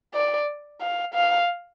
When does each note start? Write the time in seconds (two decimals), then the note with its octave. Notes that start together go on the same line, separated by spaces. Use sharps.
0.14 D5
0.81 F5
1.14 F5